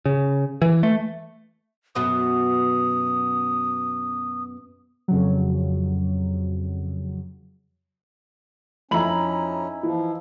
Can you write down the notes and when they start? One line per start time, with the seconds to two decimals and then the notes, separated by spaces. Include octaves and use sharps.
0.05 C#3
0.62 E3
0.83 A3
1.95 F#2 B2 B3 D#6
5.08 F2 C#3 F#3
8.91 F2 C#4 D#4 E4 A#5 B5 F#7
9.83 E3 F3